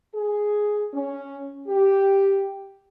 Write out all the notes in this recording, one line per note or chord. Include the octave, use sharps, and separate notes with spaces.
G#4
C#4
G4